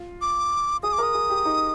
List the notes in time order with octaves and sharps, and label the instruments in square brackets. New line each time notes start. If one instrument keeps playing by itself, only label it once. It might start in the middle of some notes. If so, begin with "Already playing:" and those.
Already playing: [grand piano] F4
[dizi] D6
[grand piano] G#4 [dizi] D#6
[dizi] D6
[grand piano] A#4 [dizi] D#6
[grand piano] G#4
G4
D#4